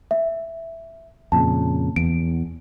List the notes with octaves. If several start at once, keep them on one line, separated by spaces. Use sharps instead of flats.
E5
F2 A#2 C#3 A5
E2 D7